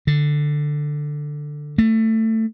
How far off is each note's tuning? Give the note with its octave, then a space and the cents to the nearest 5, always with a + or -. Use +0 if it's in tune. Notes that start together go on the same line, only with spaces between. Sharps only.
D3 +10
A3 +20